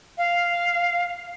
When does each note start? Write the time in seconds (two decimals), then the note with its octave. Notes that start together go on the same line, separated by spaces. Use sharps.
0.18 F5